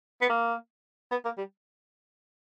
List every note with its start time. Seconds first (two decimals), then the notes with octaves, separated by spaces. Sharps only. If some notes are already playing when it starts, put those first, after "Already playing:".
0.21 B3
0.29 A#3
1.11 B3
1.25 A#3
1.38 G3